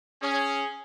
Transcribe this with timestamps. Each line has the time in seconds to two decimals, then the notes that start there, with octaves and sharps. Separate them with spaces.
0.22 C#4 G#4